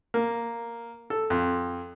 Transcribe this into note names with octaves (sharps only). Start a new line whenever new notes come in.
A#3
A4
F2